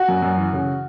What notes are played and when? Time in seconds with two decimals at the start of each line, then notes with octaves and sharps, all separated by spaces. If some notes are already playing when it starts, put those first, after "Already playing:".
Already playing: F#4
0.08 F#2
0.22 F#2
0.37 E3
0.53 C#3